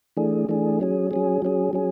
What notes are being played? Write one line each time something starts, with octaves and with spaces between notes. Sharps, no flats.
E3 A3 D4 G#4
E3 A3 D4 G#4
F#3 C#4 G#4
F#3 C#4 G#4
F#3 C#4 G#4
F#3 C#4 G#4